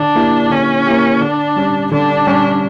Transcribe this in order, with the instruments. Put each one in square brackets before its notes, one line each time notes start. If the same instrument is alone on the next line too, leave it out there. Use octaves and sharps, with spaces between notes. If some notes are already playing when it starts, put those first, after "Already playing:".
Already playing: [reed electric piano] D3 [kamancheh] D4
[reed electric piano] A#3 E4 G4
[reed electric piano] D3 [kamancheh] C#4
[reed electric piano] A#3 E4 G4
[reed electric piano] D3 [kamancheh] D4
[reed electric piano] G3 C#4 G4
[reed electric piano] D3 [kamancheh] D4
[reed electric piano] G3 C#4 G4